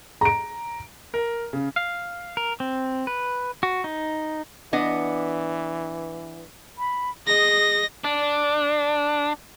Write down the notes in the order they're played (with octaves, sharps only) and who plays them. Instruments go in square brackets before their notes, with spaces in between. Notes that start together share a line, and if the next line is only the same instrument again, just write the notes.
[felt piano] A#5 D7
[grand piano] A#4
C#3
[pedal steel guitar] F5
A#4
C4
B4
F#4
D#4
[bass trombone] E3 [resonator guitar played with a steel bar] B3 D4 D#5
[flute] B5
[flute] G#4 [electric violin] D#5 A#6
[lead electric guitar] D4